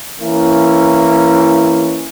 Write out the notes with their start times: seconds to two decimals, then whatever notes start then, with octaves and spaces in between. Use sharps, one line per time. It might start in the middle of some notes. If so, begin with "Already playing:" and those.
0.20 E3 A#3 C#4 E4